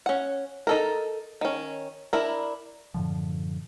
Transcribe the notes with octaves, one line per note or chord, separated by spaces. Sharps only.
C#4 F#5
D#4 A4 A#4
D#3 C#4
D4 E4 A#4
F#2 A2 D3 F3